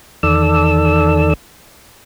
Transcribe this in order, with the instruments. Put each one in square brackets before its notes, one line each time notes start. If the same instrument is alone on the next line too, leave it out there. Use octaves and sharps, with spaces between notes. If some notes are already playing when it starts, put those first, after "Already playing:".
[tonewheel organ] E2 D#3 A4 D5 E6